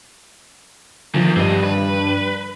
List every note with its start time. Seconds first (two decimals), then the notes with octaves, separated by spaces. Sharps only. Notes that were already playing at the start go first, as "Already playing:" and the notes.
1.14 E2 D3 D#3 F3
1.36 G2 C4 D#5
1.63 B4